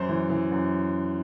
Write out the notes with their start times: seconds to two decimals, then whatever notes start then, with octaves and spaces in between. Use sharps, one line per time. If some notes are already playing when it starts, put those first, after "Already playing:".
Already playing: F#2 C5
0.09 E3
0.30 E3
0.51 F#2